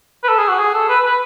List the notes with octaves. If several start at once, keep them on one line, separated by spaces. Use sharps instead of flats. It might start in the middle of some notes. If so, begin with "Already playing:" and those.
B4
A4
G#4
F#4
G#4
A4
B4
B4